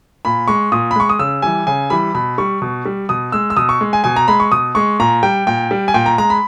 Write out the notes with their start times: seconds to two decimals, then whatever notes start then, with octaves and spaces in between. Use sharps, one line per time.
0.25 A#2 B5
0.48 G#3 C#6
0.72 A#2 D#6
0.91 B5
0.96 G#3 C#6
1.09 D#6
1.19 C#3 E6
1.42 E3 G3 G#5
1.67 C#3 G#5
1.90 E3 G3 B5
2.15 B2 B5
2.38 G3 C#6
2.62 B2
2.85 G3
3.09 B2 D#6
3.32 G#3 E6
3.50 E6
3.57 B2 D#6
3.69 C#6
3.81 G#3
3.93 G#5
4.04 B2 G#5
4.16 A#5
4.28 G#3 B5
4.40 C#6
4.52 B2 D#6
4.75 G#3 C#6
4.99 A#2 A#5
5.23 G3 G5
5.47 A#2 G5
5.71 G3
5.88 G#5
5.94 A#2 G5
6.06 A#5
6.18 G#3 A#5
6.30 B5